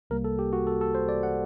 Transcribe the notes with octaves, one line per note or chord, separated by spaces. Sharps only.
C2 C3 G3 A#3 A#4
A4
G4
F#4
A4
A4
C5
D5
F#5